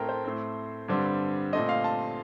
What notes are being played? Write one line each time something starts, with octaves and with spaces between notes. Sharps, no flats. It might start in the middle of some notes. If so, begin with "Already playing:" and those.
Already playing: A2 A3 C4 A#4 G5 A5
C5
A2 A3 C4
G2 D3 G3 C4
A#2 A3 C4 D#5
F5
A5